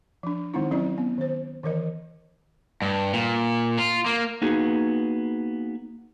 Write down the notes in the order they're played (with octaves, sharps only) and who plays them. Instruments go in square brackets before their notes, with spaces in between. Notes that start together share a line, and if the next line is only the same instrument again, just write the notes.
[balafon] F3 D4
D#3 G#3 C4 D#4 E4
F#3 C4 C#4 E4 D5
B3
D#3 C5
D#3 E3 A#4 D#5
[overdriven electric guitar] G2
A#2
F4
A#3
[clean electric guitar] A#3 B3 D#4 F#4 G#4